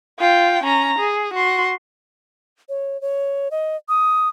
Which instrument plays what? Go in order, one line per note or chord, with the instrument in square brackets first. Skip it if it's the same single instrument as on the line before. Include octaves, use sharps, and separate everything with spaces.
[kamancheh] F4 G5
C#4 A#5
G#4
F#4 C6
[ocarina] C#5
C#5
D#5
D#6